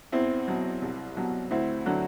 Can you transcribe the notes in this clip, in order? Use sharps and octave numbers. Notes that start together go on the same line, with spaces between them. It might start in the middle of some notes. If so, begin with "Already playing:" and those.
E2 C4 E4
B2 F#3
C2
B2 F#3
D2 C4 E4
D3 F#3